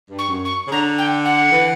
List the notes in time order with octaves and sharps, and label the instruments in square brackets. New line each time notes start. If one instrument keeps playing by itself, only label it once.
[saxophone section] G2
[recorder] C#6
[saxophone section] F#2
[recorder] C#6
[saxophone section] C#3
[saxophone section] D3 [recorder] A#5
[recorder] G5
F#5
[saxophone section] E3